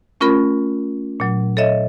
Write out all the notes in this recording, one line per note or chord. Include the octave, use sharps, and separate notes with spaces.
A3 C#4 F4 A#4 B5
A#2 F#3
A4 C#5 D#5 E5